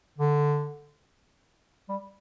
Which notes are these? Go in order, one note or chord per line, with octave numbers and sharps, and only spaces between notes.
D3
G3